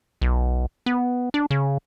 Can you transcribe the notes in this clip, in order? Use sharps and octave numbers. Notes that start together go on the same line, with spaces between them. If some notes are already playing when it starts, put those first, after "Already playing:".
B1
B3
D4
C#3